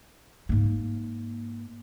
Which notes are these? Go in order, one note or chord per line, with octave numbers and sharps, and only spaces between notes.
G#2 A#3